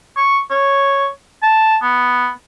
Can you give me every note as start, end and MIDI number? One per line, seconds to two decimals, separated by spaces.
0.17 0.40 85
0.51 1.08 73
1.43 1.77 81
1.82 2.29 59